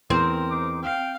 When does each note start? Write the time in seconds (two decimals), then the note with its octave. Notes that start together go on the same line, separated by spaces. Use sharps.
0.10 E2 C4 A#4
0.50 D#4 C5 D6
0.83 F5 G5